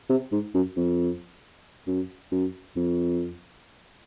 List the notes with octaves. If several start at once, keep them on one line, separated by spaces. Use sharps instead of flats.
C3
G#2
F#2
F2
F#2
F#2
F2